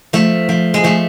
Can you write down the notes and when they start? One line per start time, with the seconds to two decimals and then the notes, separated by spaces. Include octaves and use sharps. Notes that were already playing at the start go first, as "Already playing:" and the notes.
0.13 F3 A3
0.49 F3
0.74 G#3
0.84 F3 A3